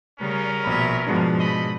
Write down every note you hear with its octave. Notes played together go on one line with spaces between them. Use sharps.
C#3 G3 B3 C#4 A#4
A#1 B2 E5 B5
G#2 B2 F3 G#3 D4
A3 D#5 B5